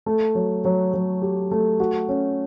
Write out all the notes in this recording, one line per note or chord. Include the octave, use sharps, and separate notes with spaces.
A3
F#3
F#3
F#3
G4
A3
F#4
C#4